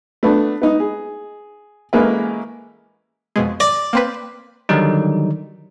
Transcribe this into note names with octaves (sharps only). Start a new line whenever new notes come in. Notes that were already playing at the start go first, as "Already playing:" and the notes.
A3 B3 D4
B3 D#4
G#4
A1 G#3 A#3 G#4 A#4 B4
F2 B2 G#3
D5 A#6
A#3 C4 B4
D3 D#3 F#3 G3 D#4